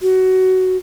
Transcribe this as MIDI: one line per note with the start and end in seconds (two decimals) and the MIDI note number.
0.01 0.77 66